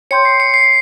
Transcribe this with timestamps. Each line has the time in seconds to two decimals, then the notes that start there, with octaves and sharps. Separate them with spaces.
0.11 C#5 G5 C6 G6 C#7
0.25 C7
0.40 C#7
0.54 C7